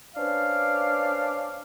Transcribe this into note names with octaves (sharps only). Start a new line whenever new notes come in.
C#4 D4 B4 C5 D5 F5